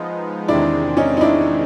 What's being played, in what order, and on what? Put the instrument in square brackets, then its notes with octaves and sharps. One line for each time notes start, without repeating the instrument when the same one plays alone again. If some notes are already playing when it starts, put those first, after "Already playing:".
Already playing: [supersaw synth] F3 G#3 B3 D#4 [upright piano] F4
[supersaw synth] E2 C3 D#3 G#3 C4 [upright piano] D4 E4
[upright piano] C#4 D#4
D#4
D4 E4